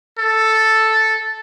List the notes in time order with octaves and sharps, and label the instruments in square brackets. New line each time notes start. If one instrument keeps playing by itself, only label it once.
[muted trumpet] A4